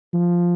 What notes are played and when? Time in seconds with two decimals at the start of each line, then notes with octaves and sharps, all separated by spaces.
0.14 F3